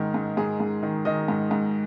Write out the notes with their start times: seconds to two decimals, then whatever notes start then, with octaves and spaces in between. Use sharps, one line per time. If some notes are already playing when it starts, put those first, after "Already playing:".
Already playing: G#2 D#3 A#4
0.14 G#2
0.37 G#2 G#4
0.60 G#2
0.83 D#3
1.05 D#3 D#5
1.28 G#2
1.51 G#2